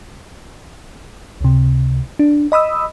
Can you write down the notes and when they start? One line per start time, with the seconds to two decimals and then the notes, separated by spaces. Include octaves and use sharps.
1.41 C#2 C3
2.19 D4
2.52 D#5 B5 D#6 E6